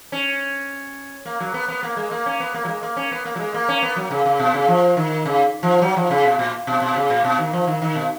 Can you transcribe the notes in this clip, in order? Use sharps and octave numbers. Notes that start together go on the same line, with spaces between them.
C#4
A#3
F#3
B3
B3
A#3
G#3
A#3
C#4
B3
A#3
F#3
G#3
A#3
C#4
B3
A#3
F#3
G#3
A#3
C#4
B3
F#3
C#3
C#3
B2
C#3
F3
D#3
C#3
F3
F#3
F3
C#3
B2
A#2
B2
B2
C#3
A#2
B2
D#3
F3
D#3
D#3
B2